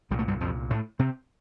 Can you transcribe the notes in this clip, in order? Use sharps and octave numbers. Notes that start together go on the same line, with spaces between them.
C2 A#2 G3
A3
G2 G3
F2 F3
A2 A3
C3 C4